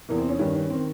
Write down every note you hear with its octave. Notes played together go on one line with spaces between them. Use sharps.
E2 C3 E3 A#3
C4
C#4
G2 D#3 C#4
C#4
D#3 C4